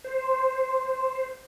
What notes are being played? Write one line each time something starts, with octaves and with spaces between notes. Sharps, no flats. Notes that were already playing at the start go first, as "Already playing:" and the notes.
C5